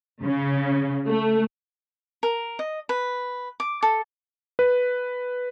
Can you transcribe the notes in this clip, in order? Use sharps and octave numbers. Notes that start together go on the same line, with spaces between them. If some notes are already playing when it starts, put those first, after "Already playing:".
C#3
A3
A#4
D#5
B4
D6
A4
B4